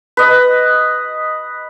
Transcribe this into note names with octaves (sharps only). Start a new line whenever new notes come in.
B4 D#5